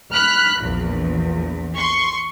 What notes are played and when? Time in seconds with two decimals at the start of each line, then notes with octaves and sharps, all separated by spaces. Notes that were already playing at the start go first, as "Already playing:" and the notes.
0.12 B5 F6 F#6 B6
0.61 A#1 E2
1.76 C6 C#6